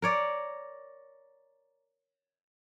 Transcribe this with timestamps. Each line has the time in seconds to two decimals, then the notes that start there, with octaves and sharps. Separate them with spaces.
0.02 A#4 C#5 D5